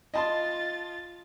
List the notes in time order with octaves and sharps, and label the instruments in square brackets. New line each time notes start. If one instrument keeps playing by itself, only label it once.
[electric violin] F4 A6 [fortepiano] D#5 A5 C6